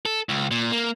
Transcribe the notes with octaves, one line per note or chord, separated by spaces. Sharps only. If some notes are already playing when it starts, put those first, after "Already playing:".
A4
C#2
A#2
A#3